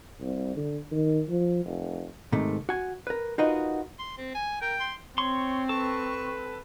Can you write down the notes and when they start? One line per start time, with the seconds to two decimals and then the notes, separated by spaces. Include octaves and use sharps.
0.21 C2
0.56 D3
0.92 D#3
1.29 F3
1.65 F1
2.32 G#2 C3 D#3 A3
2.69 F#4 G#5
3.07 A#4 B4
3.38 D#4 F4 F#4 A#4 B4 D#5
3.99 C6
4.18 C4
4.35 G#5
4.62 A#4 G5
4.80 C6
5.18 C4 C#5 C6 C#6
5.69 A4 B4 C#6